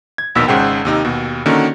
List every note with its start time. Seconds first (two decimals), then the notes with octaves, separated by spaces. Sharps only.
0.18 G#6
0.35 A#1 D#2 B2 D#3 E6 B6
0.48 G#1 G#2 C#3 C5 F#5 G5
0.85 D#2 C3 D#4
1.05 D#2 B2
1.46 D3 D#3 A#3 C#4 F#4